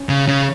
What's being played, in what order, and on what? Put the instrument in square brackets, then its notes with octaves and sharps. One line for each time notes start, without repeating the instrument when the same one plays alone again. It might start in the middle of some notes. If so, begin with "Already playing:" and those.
Already playing: [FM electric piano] C#4
[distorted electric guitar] C#3
C#3